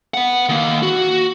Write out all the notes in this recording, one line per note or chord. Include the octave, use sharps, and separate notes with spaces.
B3 F#5
D#3 A#3
F#4